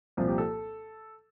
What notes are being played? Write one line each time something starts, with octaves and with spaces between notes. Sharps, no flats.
C2 A#2 F3
G4
A4